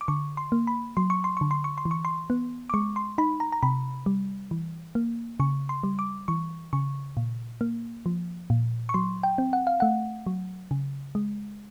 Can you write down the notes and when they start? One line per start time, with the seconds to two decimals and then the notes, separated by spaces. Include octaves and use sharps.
0.01 D6
0.08 D3 C#6
0.37 C6
0.52 A#3
0.67 B5
0.97 F#3 C6
1.10 C#6
1.24 C6
1.37 D3 C#6
1.51 C6
1.64 C#6
1.78 C6
1.85 E3
1.91 C#6
2.05 C6
2.30 B3
2.70 D6
2.74 G#3 C#6
2.96 C6
3.18 D#4 B5
3.40 A#5
3.52 A#5
3.63 C3 B5
4.06 G3
4.51 E3
4.95 A#3
5.40 C#3 C#6
5.69 C6
5.83 G3
5.99 D6
6.28 E3 C#6
6.73 C#3 C#6
7.17 A#2
7.61 A#3
8.06 F3
8.50 A#2
8.89 C#6
8.94 F#3 C6
9.23 G5
9.38 C4
9.53 F#5
9.67 F5
9.80 A3 F#5
10.27 F#3
10.71 C#3
11.15 G#3